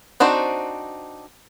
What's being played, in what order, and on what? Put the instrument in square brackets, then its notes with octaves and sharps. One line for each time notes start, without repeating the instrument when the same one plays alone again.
[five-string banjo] C4 D4 D#4 F#4 C5